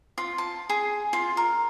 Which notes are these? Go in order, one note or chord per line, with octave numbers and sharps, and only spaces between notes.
F4
A5
G#4
F4
A#4